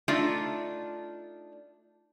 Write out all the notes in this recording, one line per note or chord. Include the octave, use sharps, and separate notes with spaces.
A3 D4 D#4 F4